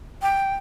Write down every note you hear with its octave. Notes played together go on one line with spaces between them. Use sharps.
G5